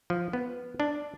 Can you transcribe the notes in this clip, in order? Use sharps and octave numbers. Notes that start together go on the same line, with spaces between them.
F3
B3
D4